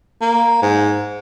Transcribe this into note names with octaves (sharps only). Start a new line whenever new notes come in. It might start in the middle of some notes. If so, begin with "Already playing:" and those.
A#3
G#2